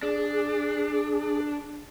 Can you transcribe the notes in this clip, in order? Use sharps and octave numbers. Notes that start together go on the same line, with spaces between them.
D4 G#4